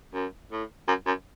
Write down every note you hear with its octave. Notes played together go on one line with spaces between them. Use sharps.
F#2
A2
F#2
F#2